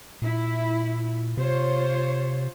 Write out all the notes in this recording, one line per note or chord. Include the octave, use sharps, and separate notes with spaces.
A#2 E4
C3 F4 C5 C#5